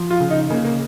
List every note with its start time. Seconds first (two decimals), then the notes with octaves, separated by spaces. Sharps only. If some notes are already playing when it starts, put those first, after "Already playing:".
Already playing: F3
0.10 F4
0.20 C#3
0.31 D#4
0.50 C#3 A#3
0.65 A#3